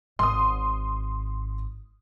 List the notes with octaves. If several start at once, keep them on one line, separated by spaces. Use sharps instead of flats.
G#1 C6 D#6